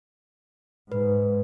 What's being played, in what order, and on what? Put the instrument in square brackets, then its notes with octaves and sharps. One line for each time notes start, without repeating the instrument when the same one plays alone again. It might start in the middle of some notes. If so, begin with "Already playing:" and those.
[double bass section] G#2 [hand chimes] B4